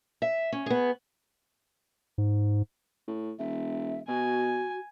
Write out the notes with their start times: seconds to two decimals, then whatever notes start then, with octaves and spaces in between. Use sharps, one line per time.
0.22 E5
0.52 C#4
0.66 B3 G#4
2.18 G#2
3.08 A2
3.39 E1 E5
4.08 B2 F#4 G#5